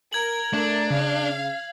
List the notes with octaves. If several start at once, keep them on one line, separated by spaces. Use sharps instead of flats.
A#4 G#6 F#7
A3 D4
C#3 F5